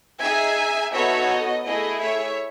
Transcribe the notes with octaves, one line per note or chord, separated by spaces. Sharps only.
D#4 G#4 E5 G#5
B3 D#4 F#4 A4 C#5 E5
D#5
A3 E4 G#4 D#5
C#5 E5